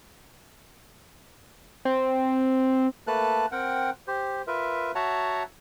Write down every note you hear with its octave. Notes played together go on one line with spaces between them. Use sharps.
C4
A3 A#3 A4 B4 A5 F#6
C4 A#4 F#5 G5
G4 C5
F4 A#4 B4 E5
F#4 C#5 E5 F#5 A5 A#5